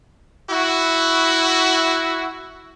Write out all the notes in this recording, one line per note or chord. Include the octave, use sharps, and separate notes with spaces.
E4 F#4